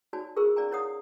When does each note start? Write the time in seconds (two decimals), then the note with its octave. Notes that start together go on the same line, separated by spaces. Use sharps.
0.13 D#4 F#4 C#5 D5 G#5 A5
0.36 F4 G#4 A#4 C5 C#6 E6
0.56 C#4 D#4 D5 F5 G#5 A#5
0.71 E4 A#4 C#5 F5 F#5 D#6